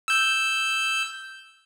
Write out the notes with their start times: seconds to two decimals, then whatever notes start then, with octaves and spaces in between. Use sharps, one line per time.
0.08 E6 G6